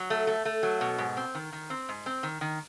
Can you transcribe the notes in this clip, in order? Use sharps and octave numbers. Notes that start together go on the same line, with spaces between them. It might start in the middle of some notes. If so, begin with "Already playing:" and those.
Already playing: F#3
A3
A3
A3
F#3
B2
G#2
C4
D#3
D#3
C4
G#2
C4
D#3
D#3